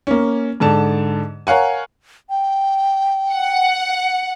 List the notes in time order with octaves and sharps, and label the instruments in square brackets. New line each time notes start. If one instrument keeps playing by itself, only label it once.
[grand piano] A#3 C#4
G#2 D3 A5 E7
A#4 C#5 F5 F#5 G#5
[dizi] G5
[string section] F#5